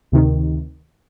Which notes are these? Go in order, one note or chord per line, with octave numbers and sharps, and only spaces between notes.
D2 C3 D#3